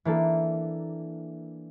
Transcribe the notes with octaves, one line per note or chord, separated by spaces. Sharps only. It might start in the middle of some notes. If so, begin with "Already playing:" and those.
E3 A#3 D4 A4